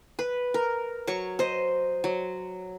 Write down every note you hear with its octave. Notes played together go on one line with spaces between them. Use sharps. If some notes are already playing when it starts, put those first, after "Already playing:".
B4
A#4
F#3 C#5 C#6
C5 D#5
F#3